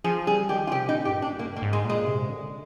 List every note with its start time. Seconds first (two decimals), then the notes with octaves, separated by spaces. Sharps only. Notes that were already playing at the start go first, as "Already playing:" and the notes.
0.04 F3 G#4
0.27 G3 G#4
0.49 D#3 G4
0.67 F4
0.72 C3 G4
0.89 A#2 D#4
1.05 G2 G4
1.22 A#2 D4
1.39 G2 A#3
1.56 A#3
1.62 G#2
1.73 G#3
1.85 A#2 G#3
2.06 C3
2.29 D3